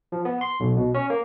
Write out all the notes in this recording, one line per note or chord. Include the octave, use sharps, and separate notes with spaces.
F3
B3
C6
B1
B2
C#4
A#3